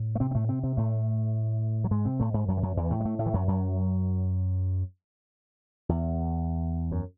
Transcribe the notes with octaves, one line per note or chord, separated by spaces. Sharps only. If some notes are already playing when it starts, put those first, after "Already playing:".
Already playing: A2
A3
C3 C4
C4
A2 A3
C3 C4
C3 C4
A2 A3
F#3
G#2 G#3
C3 C4
A2 A3
G#2 G#3
F#2 F#3
E3
F#2 F#3
E2 E3
A2 A3
G#3
A2 A3
A2 A3
E3
F#2 F#3
F#2 F#3
E2
F#2